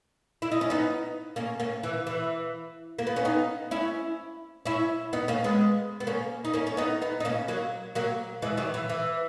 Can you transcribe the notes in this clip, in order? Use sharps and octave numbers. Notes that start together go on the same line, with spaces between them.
E4
D#4
C#4
B3 D#4
A#3 C#4
A#3 C#4
E3
E3
A#3
B3
C#4
B3 D#4
C#4 E4
C#4 E4
B3 D#4
A#3 C#4
G#3 B3
B3
A#3 C#4
D#4
A#3 C#4
C#4
B3 D#4
B3 D#4
D#4
A#3 C#4
F#3 A#3
F#3 A#3
E3 G#3
D#3 F#3
E3
E3